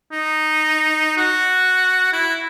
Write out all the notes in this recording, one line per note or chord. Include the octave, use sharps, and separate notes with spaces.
D#4
F#4
E4